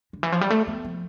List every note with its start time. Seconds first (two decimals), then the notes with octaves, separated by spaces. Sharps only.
0.13 D3
0.23 E3
0.32 F3
0.41 G3
0.50 A3
0.67 B3
0.85 F3